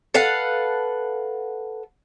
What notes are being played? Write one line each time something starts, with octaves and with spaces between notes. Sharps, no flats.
A4 B4 F5 F#5